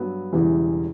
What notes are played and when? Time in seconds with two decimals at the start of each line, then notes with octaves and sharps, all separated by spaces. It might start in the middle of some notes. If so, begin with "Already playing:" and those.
Already playing: G2 F#3 B3
0.32 E1 E2 C#3 E3 G3